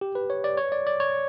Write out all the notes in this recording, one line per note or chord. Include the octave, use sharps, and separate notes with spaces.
G4
B4
C#5
D5
C#5
D5
D5
C#5